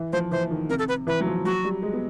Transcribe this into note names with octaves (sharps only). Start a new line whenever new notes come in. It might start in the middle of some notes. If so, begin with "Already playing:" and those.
Already playing: E3
F3 C5
E3 C5
D#3
C3 A#4
A4
B4
E3 B4
F#3
F3
F#3 F#4
G3
G#3
B3